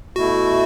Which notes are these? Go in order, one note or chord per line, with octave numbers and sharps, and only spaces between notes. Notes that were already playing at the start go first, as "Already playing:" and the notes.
B2 A3 E4 F#4